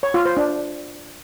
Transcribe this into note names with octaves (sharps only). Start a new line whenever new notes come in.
C#5
F4
C5
D4